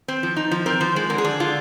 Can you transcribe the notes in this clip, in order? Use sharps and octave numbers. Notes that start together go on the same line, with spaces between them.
C4
F3
D#4
F3
C4 A#4
F3 C5
G#3
D3 A#4
G#4
D4
D3 F4